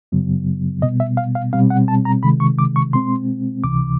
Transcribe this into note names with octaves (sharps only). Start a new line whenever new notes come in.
F#2 C#3 F#3 B3
B2 G3 B3 D#5
E5
F5
F5
B2 G3 C4 F5
F#5
A5
A#5
C3 D#3 G#3 B5
C#6
D6
C#6
B2 G#3 C4 C6
C#2 C3 E3 D6